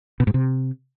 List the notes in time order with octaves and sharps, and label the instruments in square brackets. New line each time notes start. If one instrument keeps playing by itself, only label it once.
[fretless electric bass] B2
G#2
C3